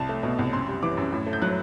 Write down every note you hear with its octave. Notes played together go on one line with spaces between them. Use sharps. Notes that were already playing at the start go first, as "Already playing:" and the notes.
Already playing: C2 A5
A3
B2
C2
F#2 C6
G3
E3 D6
F#2
A2
A3
G6
F#3 F#6